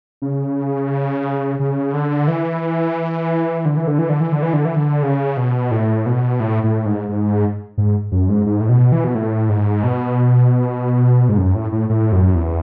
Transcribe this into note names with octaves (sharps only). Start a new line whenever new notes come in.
C#3
C#3
D3
E3
D3
E3
D3
E3
D3
E3
D3
E3
D3
E3
D3
C#3
B2
A2
B2
A2
A2
G#2
G#2
G#2
F#2
G#2
G#2
A2
B2
E3
B2
A2
G#2
B2
G#2
F#2
A2
A2
A2
F#2
E2